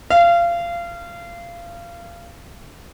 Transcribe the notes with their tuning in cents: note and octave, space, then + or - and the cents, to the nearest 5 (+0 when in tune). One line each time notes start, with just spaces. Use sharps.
F5 -25